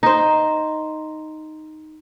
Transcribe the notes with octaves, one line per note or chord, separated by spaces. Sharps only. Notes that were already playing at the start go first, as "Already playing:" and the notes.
D#4 C5